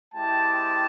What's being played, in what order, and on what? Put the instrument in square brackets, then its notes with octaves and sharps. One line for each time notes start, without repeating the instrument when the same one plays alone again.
[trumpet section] G#3 C4 E4 G4 G5 A5